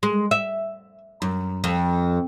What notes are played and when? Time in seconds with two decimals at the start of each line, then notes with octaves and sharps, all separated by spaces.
0.03 G#3
0.31 E5
1.22 F#2
1.64 F2